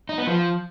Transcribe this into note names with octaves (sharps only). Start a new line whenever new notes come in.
D#4
B3
F3